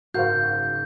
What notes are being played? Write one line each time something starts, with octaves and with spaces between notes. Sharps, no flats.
F#1 G#2 F#4 A#4 C5 F5 G6